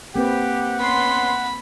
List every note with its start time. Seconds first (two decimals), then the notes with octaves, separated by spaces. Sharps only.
0.16 A#3 C4 G4 B4 F#5
0.81 B3 C#4 B5 C6